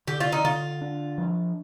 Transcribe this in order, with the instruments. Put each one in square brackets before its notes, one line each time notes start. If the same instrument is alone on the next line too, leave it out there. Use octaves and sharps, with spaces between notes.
[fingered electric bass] D3 [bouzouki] G4
[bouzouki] F4
D#4
[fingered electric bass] D3 [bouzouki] F4
[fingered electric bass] D4
F3